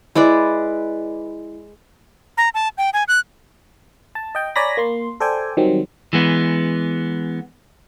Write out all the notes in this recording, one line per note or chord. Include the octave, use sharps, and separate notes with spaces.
G#3 E4 B4 D5
A#5
A5
G5
G#5
F#6
A5
D#5 G5
C#5 D5 G#5 A#5 B5 A#6
A#3 C6
A4 C5 D5 G5 G#5
D#3 F#3 G3 C4
E3 G#3 B3